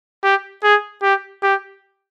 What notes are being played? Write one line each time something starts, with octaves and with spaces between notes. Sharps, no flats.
G4
G#4
G4
G4